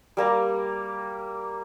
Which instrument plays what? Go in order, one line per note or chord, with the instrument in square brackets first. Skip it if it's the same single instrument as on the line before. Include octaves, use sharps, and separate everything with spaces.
[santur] G3 A#3 A#5